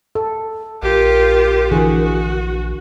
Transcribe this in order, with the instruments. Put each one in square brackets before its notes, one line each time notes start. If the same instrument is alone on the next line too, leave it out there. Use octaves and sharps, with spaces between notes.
[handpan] A4
[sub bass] A#1 [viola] F4 G4 [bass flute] A#4
[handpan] D3 E3 G#4 [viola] F#4